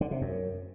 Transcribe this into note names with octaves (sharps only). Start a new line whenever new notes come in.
D3
C3
F#2